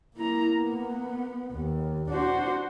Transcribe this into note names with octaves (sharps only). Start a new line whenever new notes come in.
A#3 E4 A#5
B3
D#2
D4 F#4 C5